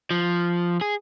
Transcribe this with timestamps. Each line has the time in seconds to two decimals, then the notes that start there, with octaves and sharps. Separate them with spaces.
0.11 F3
0.81 G#4